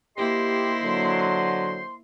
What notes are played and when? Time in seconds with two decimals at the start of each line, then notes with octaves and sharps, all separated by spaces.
0.18 A#3 E4 G4 C5 D#5 C6
0.83 D3 F#3